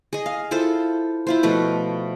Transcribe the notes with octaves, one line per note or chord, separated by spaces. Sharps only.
G#4 D#5
F5
E4 F4 A4 C5
E4 F4 C5
B2 F3 A3 B4